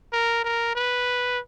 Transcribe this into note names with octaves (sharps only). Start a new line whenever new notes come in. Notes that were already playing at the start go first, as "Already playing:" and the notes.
A#4
A#4
B4